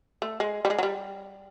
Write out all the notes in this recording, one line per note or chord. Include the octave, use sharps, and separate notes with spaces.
A3
G#3
G3
G#3
F#3
G3